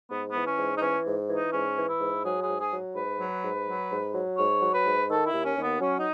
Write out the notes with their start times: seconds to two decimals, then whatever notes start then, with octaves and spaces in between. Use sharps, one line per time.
0.11 G#2 B3
0.30 B3
0.35 E3
0.47 C#4
0.58 G#2
0.77 D#4
0.82 E3 C#4
1.06 G#2
1.29 E3
1.35 D#4
1.53 G#2 C#4
1.77 E3
1.89 E4
2.00 G#2
2.25 F#3 G#4
2.42 G#4
2.49 G#2
2.60 G#4
2.72 F#3
2.95 G#2 B4
3.19 F#3
3.43 G#2
3.67 F#3
3.91 G#2
4.14 F#3
4.38 G#2 C#5
4.62 F#3
4.73 B4
4.85 G#2
5.09 D#3 A4
5.26 E4
5.33 D#2
5.44 C#4
5.56 D#2
5.62 B3
5.80 F#3 C#4
5.98 D#4